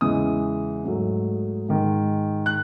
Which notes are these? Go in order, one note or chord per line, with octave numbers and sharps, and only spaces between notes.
E2 C#3 E3 G#3 D#6
G#2 F#3 A3
G#2 D#3 G#3
F#6